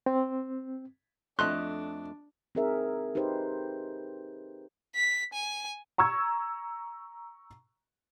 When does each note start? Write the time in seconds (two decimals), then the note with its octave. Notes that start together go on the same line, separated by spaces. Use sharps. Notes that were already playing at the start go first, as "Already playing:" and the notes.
0.06 C4
1.39 F2 A3 D4 D#5 C6 F#6
2.55 C4 D#4 G#4 A#4 E5
3.15 D#4 G4 B4 C5
4.95 B6
5.33 G#5
5.98 A#5 C#6 E6 G#6